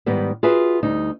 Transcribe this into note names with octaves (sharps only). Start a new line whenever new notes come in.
G#2 D#3 G3 B3
F4 F#4 G#4 B4 E5
D2 G3 D#4